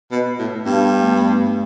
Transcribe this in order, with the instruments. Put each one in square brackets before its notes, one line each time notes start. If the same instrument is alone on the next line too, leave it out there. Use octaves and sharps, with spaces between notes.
[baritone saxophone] B2
A2
[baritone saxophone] G2 [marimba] B3
[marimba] A3
B3
A3